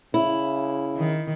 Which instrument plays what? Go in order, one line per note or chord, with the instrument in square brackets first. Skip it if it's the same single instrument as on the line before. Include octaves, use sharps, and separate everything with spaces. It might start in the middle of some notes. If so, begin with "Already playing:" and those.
[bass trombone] C#3 [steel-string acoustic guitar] E4
[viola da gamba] D#3